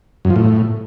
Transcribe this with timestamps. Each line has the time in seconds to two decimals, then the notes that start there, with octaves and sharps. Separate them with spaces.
0.25 F#2
0.30 F3
0.36 A2